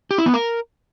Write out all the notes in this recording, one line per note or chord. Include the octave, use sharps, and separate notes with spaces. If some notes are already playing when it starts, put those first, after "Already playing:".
G4
E4
B3
A#4